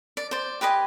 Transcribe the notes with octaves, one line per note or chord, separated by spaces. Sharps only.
D5
C5 D5
G4 B4 D#5 G#5